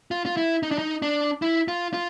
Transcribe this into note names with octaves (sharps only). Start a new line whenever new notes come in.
F4
F4
E4
D#4
D4
D#4
D4
E4
F4
F4